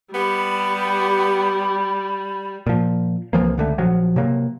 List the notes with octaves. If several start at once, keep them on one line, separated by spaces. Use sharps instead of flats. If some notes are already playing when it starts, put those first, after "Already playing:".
G3 B3 G4 B5
A#2 F3
C2 E3 F3 A#3
C#2 D3 A3
A#1 F3 F#3
C3 F#3 A#3